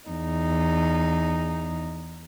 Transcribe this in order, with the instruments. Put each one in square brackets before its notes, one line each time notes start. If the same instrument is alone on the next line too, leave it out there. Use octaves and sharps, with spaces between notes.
[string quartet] E2 D#4